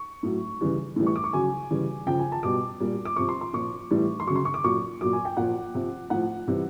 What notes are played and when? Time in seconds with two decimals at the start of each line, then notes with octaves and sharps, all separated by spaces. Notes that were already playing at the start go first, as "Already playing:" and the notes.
Already playing: C#6
0.23 A2 F#3
0.61 C#3 E3 G3
0.96 A2 E3 G3
1.07 C#6
1.16 D6
1.24 C#6
1.33 C#3 F#3 G#5
1.71 C#3 E3 G3
2.06 C#3 F3 G5
2.19 G#5
2.32 A5
2.43 B2 G3 D6
2.80 A#2 G3
3.05 D6
3.16 C3 F3 C#6
3.29 C6
3.41 C6
3.53 A#2 F3 C#6
3.91 A2 E3 G3
4.20 C6
4.27 C#3 F#3 C#6
4.36 C6
4.45 C#6
4.54 D6
4.64 A#2 F#3 C#6
5.01 A#2 F#3 D6
5.13 G#5
5.25 G5
5.37 A#2 F3 F#5
5.74 C3 F3
6.10 A2 F3 F#5
6.48 C3 E3 G3